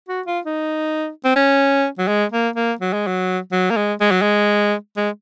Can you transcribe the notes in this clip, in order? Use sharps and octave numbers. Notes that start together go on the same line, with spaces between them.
F#4
F4
D#4
C4
C#4
F#3
G#3
A#3
A#3
F#3
G#3
F#3
F#3
A#3
G#3
G#3
F#3
G#3
G#3